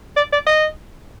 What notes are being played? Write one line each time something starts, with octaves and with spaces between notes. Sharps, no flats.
D5
D5
D#5